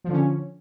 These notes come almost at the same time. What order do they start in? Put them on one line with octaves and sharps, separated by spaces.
F3 D3 C#4